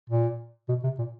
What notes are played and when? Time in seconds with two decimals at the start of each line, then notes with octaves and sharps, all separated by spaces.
0.10 A#2
0.68 B2
0.83 C3
0.98 A#2